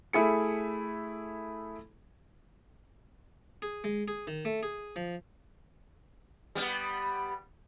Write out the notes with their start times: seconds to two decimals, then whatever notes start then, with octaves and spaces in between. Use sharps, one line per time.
0.13 A3 E4 G#4 C#7
3.62 G#4
3.84 G#3
4.08 G#4
4.27 D#3
4.45 A3
4.63 G#4
4.96 F3
6.55 G3 B3